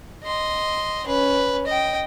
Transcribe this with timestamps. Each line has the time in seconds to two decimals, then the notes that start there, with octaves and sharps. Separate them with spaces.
0.24 D#5 C6
1.07 C#4 B4
1.67 D#5 G5